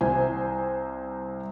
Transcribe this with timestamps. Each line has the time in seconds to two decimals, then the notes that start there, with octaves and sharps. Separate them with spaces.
0.01 C2 C5 G#5